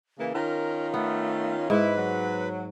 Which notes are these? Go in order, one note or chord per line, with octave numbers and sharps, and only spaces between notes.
C#3 E3 A#3
D#3 C#4 F4 A#4
A3 B3
G#2 E4 B4
F#3